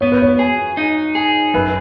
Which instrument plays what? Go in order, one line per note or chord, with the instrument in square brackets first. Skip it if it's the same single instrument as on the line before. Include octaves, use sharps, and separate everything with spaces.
[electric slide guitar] B3 [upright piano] C#5
[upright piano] B4
C#5
[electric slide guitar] G#4
D#4
G#4
[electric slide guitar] F#2 [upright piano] B4